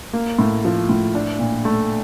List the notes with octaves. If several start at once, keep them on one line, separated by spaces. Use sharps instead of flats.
A#3
A2
F3
A2
D4
A#2
A3